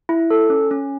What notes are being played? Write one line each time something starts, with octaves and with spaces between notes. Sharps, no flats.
E4
A4
C#4
C#4